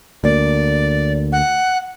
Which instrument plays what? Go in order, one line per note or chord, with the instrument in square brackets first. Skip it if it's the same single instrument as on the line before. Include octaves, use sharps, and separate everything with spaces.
[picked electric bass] D2 A#3 [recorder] D5
[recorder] F#5